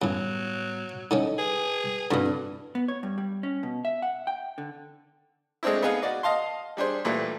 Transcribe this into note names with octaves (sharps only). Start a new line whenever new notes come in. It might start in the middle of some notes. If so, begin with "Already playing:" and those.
F#2 A2 E3 F#3 G3 B3
D3 D#3 C#4 E4 A4 D#5
G#4 B4
G2 B2 D3 C4 E4 F#4
B3
C#5
G2
G3
C#4
B2
E5
F#5
G5
D3
G#3 A3 C4 D4 E4
B3 D#4 G#4 B4 F5
F#4 D5 D#5
D#5 F5 A5 C6
G3 D4 G#4 C5
A#2 E3 G3 A3